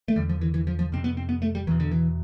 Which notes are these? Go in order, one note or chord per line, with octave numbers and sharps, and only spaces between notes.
A3
E2 D3 G3
F3
E3
E3
F3
F3
F2 C3 C4
B3
C4
B3
A3
G3
E2 B2 E3
D3
E3